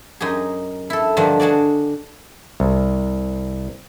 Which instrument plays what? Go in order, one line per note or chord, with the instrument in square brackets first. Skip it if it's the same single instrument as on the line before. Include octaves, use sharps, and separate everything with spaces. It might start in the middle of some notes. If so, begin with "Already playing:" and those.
[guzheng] F#2 D#4 G4 G#4
E4 A4
G2 D3 D#3 F3 G3 D4
D4 F#4 G#4 D5
[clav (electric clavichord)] C2